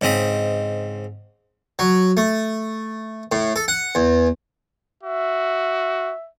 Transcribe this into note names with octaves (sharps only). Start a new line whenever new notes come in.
G#2 C#3 C4 D#5 B5
F#3
A3
A2
A4
F#5
E2
F#4 E5